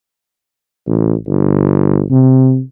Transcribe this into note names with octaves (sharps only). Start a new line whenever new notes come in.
A1
G1
C3